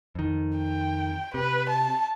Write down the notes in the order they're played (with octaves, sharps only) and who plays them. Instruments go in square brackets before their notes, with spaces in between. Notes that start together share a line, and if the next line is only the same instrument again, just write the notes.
[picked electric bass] F2 D#3
[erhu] G5
[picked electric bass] C3 [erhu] B4
[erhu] A5